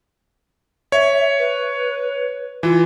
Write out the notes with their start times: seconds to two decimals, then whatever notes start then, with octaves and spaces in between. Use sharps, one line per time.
0.92 C#5 E5
1.38 B4
2.63 E3 F4